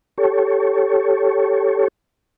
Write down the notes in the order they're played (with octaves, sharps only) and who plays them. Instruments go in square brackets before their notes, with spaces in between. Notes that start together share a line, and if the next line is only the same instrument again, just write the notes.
[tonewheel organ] G4 A4 C#5